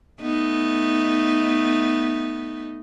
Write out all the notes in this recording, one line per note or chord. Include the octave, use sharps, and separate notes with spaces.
A3 B3 D#4